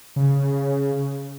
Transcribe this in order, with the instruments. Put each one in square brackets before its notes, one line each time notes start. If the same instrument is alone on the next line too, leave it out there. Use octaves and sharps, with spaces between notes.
[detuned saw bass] C#3